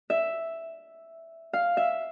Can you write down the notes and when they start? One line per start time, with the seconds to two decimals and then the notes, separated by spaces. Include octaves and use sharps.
0.10 E5
1.53 F5
1.77 E5